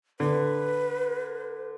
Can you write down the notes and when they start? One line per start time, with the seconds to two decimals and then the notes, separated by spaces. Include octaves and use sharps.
0.20 D3 B4